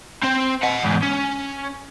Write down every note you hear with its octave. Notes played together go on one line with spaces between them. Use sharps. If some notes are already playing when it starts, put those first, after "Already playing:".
C4 C5
D#5 F#5
E2 G#2
C#4